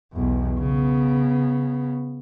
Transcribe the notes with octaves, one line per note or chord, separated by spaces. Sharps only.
B1 E2
C#3 B3